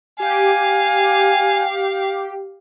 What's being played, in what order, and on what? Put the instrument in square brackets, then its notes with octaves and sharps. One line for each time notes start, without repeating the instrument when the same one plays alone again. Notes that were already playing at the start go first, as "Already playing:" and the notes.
[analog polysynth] G4 [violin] F5 [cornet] G#5